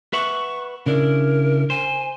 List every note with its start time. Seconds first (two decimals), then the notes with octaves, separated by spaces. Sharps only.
0.13 B4 E5 F#5 C#6
0.86 C#3 D4 E4 A#4
1.70 C5 G#5